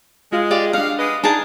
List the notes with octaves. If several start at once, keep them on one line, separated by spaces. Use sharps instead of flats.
G#3 F4
G4 D5 F5
C#4 D4 F5 F#5
G#3 B4 D#5
D4 D#4 G#4 A#4 A5